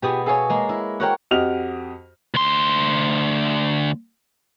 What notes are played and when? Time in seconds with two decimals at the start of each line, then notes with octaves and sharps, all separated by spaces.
0.02 B2 B3 F4 G4 G#4
0.26 G#4 A4 C#5 F5 G#5
0.50 G#3 A#3
0.69 E4
1.00 F#4 A#4 C5 C#5 F#5 G5
1.31 F2 F#4 G4 D#5 F6 F7
2.34 D2 C6